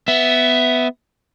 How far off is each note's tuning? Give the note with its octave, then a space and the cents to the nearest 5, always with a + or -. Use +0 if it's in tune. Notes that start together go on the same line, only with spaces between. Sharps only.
B3 +15 E5 +0